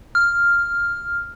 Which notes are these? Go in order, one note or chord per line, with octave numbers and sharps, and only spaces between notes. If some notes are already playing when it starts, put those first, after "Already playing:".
F6